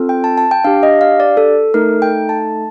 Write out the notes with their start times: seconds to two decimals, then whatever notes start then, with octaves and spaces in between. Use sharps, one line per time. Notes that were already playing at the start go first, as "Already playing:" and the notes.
Already playing: C4 F4 A4
0.09 G5
0.24 A5
0.38 A5
0.51 G5
0.64 D4 G4 F5
0.83 D#5
1.01 F5
1.20 D5
1.37 A4
1.74 A3 D#4 A4 A#4
2.02 G5
2.29 A5